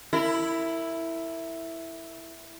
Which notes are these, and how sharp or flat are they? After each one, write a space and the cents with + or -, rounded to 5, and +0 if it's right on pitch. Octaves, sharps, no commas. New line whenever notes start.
E4 +0 A#4 -35